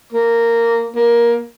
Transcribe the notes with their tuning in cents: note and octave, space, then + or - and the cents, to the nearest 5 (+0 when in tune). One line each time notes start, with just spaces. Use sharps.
A#3 -10
A#3 +15